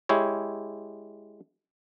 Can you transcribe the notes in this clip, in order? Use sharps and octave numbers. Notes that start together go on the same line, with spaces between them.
G#3 E4 G4 C#5